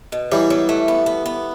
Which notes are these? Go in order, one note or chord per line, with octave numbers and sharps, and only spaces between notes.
B2
E3 F#3 G3
F#3
A3
B3
B3
B3